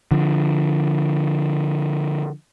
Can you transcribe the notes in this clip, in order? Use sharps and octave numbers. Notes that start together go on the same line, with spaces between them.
D3 F3